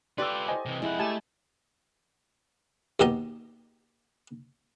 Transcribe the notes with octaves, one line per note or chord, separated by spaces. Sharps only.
F4 G4 A4 B4 D5 C6 E6
C5 D#5 G#5
C3 E3
F2 G#3 E4 F#5
A3 G4 G#5 A5
D#2 B2 G4 D#5